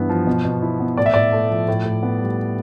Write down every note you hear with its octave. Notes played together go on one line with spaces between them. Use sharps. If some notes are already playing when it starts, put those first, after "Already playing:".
Already playing: G2 E3 B3 E4
F3
B2
B2
E4
B3
A2 D5
E5
A2 D5
A3
F3
A2
A2
B3
G3